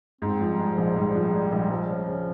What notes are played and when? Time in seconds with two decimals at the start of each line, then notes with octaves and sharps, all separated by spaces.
0.21 G#2 C4
0.40 F3
0.47 G3
0.59 G#3
0.72 F3
0.78 A#1
0.96 G#2 G3
1.08 G#3
1.14 F3
1.20 G3
1.33 G3 G#3
1.52 A#1
1.70 F3 G#3
1.89 C#4
2.07 C#3